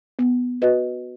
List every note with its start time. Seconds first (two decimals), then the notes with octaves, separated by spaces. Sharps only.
0.19 B3
0.62 F#4 B4 D#5